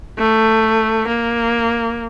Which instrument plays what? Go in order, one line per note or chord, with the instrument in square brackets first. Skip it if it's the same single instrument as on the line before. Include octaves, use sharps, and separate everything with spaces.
[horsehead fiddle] A3
A#3